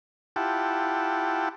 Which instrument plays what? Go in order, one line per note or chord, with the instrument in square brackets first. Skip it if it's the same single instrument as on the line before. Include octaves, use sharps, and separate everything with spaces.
[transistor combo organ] E4 F4 G4 F#5 G5 A5